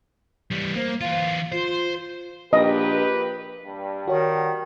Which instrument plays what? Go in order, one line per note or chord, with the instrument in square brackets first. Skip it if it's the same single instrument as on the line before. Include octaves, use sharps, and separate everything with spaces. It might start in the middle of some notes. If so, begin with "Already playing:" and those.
[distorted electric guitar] E3 G3
[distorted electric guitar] A#3 [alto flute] C5
[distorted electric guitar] E3 F4 [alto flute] F5
[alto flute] F4 [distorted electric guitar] C5
[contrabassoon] A#1 [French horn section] A#3 G4 B4 [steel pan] D#5
[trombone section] G2
[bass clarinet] D#3 [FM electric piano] F#4 C#5